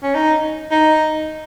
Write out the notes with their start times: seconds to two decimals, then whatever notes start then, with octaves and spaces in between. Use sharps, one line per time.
0.03 C#4
0.15 D#4
0.72 D#4